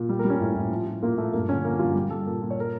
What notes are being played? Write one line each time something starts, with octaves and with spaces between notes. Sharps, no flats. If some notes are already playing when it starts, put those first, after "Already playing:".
Already playing: A#2
G3
A#4
G3
C#4
A2
A2
F3
F3
A#2 A#3
A#2 A3
G2 A#3
D3 C#4
F3 A#3
G2 F4
G3 G4
G3 A4
A#2 A#4
A#2
C#5
A#4